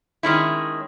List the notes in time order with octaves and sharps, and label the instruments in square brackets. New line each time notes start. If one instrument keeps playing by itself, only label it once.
[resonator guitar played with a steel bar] D#3 G#3 C#4 E4